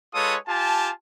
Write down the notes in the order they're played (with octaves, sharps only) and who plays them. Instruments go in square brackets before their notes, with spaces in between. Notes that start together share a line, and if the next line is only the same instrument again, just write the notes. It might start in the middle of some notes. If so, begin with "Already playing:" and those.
[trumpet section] G#3 F4 A4 B4 C#5 D#6
F4 G4 G#5 A5